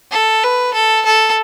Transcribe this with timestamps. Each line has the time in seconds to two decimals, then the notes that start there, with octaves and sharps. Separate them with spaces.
0.12 A4
0.44 B4
0.74 A4
1.06 A4